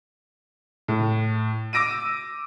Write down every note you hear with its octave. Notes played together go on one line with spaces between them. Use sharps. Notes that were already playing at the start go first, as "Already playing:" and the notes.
A2
D6 E6 A#6 D7 D#7